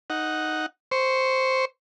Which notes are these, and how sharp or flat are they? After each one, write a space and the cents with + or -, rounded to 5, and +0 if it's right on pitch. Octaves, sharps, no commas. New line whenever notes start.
D#4 +0 F#5 +0
C5 +0 C#6 +0